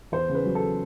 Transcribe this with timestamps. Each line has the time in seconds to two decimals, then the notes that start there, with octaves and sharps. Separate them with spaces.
0.12 E2 C5
0.29 C#3
0.35 B4
0.45 F#3
0.55 A4